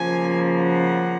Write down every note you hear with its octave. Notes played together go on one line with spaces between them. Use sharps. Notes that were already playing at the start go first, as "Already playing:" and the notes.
Already playing: C#3 F3 A#3 G#5
F#5